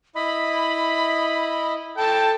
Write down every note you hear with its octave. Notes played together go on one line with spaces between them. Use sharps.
E4 D#5 B5
A4 G5 A5